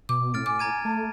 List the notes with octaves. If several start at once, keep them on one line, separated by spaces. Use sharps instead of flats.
B2 D6
A2 C4 F6 A6 D7
G#5 D6
A#5 G#6 D#7
A3 A5